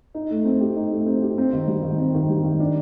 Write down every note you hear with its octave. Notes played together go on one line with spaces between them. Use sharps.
D#4
A3
C4
G4
D#4
A3
C4
G4
C4
D#3
G3
D#3
C4
D#3
G3
D#3
D4